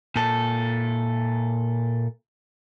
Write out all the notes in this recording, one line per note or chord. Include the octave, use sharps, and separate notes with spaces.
A#2 A4